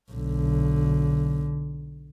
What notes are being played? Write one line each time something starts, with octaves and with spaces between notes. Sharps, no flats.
B1 D3